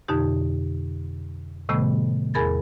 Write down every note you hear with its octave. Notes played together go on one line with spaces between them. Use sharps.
F2 B2 D3 D#4 G4
A2 C3 D#3 G3 A3 B3
E2 G#4 A#4 B5 G#6 A6